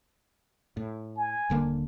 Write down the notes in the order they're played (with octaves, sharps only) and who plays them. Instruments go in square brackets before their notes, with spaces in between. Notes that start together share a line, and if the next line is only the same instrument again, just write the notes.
[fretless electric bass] A2
[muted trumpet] G#5
[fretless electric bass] D#1 D3 A#3